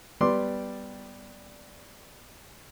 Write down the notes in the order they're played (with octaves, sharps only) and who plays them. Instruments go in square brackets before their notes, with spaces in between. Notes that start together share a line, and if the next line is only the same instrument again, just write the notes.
[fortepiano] G3 B3 D5 C6 D6